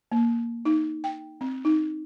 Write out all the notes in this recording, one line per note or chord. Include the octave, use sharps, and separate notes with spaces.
A#3
D#4
G5
C4
D#4